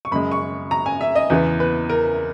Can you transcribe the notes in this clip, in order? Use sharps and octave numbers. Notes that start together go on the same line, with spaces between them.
C#6
F#2 C#3 G#3 B5
C#6
A#5
G#5
E5
D#5
E2 C#3 E3 B3
B4
A#4